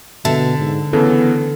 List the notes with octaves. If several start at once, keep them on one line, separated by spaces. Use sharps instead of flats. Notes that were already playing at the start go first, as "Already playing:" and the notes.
B2 D3 E5 A5
G#2
C#3 E3 B3 A4